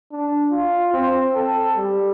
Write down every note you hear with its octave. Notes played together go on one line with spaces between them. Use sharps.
D4
F4
C4
A4
G3